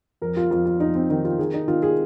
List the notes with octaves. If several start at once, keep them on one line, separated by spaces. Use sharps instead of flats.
F2 A#4
F4
F2 F4
F4
F2 D#4
C4
D#3 D#4
F4
D#3 G#4
D#4
D#3 F4
G#4